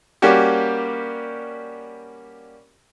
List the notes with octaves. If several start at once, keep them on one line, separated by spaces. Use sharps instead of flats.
G3 A#3 C#4 F#4 G4